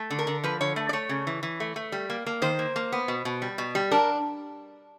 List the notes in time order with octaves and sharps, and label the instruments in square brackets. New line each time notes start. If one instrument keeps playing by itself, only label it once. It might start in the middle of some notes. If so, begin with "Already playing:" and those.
Already playing: [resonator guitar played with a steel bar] A3
D3
A#4
D3
F3 B4
D3 C#5
A3
D5
A3 C#5
C#3
E3
E3
A3
A3
G3
A#3
A#3
D#3 C5
A#3
A#3
B3
B2
B2
G3
B2
G3
D4 A#4